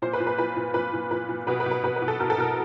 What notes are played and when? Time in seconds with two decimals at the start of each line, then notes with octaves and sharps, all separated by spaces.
0.02 A#2 C5
0.13 B4
0.20 A#2
0.27 B4
0.38 A#2 B4
0.56 A#2
0.74 A#2 B4
0.93 A#2
1.11 A#2 B4
1.29 A#2
1.47 B2 B4
1.60 B4
1.66 B2
1.71 B4
1.83 B2 B4
1.96 B4
2.02 B2
2.08 A4
2.20 B2 A#4
2.30 A4
2.38 B2 A#4